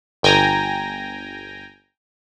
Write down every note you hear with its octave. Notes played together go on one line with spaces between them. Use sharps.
G1 G5 G#5 A#5 A#6